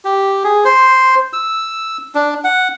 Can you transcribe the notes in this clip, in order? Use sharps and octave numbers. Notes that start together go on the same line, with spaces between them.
G4
G#4
C5
E6
D4
F#5